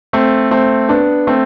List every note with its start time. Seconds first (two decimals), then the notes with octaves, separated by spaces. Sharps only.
0.13 A3 C4
0.51 A3 C4
0.89 B3 D4
1.27 A3 C4